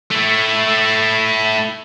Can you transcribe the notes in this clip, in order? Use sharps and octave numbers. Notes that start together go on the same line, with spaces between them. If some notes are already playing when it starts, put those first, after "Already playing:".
A3 E4